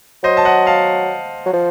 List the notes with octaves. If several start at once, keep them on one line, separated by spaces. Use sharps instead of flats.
F#3 C5 D#5
A5
D#5 F#5
F5 A5
F#3
F3